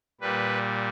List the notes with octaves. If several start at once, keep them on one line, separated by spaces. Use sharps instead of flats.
A#2 G3 B4